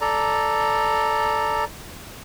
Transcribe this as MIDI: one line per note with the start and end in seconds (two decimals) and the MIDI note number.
0.01 1.64 69
0.01 1.64 74
0.01 1.64 82